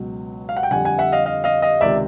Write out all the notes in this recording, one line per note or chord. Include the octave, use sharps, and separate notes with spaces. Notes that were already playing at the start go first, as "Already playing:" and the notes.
Already playing: C#2 B2 F#3
F5
F#5
G5
F2 D3 G3 F#5 G#5
F#5 G#5
E5 F#5
D#5 F5
D#5 F5
D#5 F5
D#5 F5
C#2 C3 D#3 D5 E5